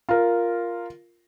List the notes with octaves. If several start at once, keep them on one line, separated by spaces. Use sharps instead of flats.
F4 A#4